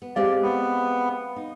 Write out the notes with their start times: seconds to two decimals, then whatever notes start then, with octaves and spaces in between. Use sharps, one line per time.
0.02 B3
0.16 G#3 C4 G4 D5 F5
0.42 B3
1.36 D#4